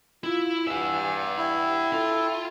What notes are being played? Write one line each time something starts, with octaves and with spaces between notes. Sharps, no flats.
E4 F4
G2 E5 F#5 G#5
E4 G5
F4 A4